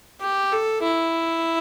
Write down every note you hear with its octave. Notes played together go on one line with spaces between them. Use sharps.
G4
A4
E4